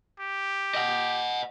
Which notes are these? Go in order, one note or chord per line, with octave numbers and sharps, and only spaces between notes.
G4
D#5 F#5